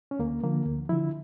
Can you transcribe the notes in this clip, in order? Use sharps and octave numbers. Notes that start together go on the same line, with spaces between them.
C#4
D2 A#3
D3 F3 A#3
D2
D3 F3 E4